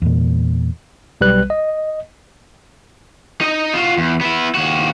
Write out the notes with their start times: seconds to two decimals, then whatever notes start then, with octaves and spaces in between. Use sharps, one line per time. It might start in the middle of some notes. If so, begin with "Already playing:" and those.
0.02 E2 A#2
1.21 B1 G3 B4 F#6
1.50 D#5
3.41 D#4 D#5
3.74 F4 F#4
3.98 E2
4.21 B3 E4
4.55 D#2 F#4